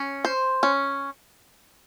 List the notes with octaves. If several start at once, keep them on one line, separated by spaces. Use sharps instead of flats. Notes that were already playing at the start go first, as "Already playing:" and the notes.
Already playing: C#4
C5
C#4